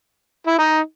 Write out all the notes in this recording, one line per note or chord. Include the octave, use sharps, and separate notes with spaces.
E4
D#4